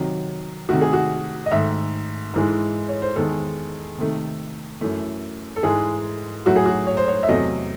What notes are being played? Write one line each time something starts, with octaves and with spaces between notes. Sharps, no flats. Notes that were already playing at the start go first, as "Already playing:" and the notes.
Already playing: C3 D#3 F#3
C3 D#3 A3 F#4
G#4
F#4
D#5
G#2 D#3 A3 E5
G#2 E3 G#3
C#5
C5
E2 D#3 G#3 A4
C3 D#3 A3
F#2 E3 A3
A4
G#2 E3 G#3 G#4
A2 F#3 A3 F#4
G#4
F#4
C#5
C5
C#5
E5
E2 C3 F#3 A3 D#5